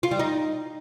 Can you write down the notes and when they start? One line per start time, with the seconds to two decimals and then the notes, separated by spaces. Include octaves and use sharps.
0.03 F4
0.11 G3
0.19 D#4